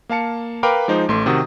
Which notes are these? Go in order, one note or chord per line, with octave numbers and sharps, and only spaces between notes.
A#3 F5 A5 C#7
A#4 B4 F5 G5 B5 D6
F3 G#3 D#4 C5
A1 A3 C6
C3 D#3 F#4 D#6